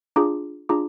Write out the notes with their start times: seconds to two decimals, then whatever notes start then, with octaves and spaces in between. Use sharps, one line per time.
0.16 D4 F4 G#4 A#5 D6
0.69 D4 F4 G#4 A#5 D6